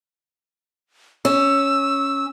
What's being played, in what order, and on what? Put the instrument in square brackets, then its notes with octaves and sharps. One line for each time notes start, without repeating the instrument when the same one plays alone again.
[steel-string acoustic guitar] C#4 [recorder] E6